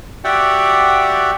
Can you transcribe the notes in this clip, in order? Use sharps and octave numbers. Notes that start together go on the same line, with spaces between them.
F#4 G4 D5 E5 F#5 G5